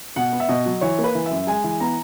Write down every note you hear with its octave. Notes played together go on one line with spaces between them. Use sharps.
B2 F#5
B3
E5
B2 D#5
F#3
E3 C#5
A#3
B4
E3
E5
F#2
G#3 G#5
E3
B3 A#5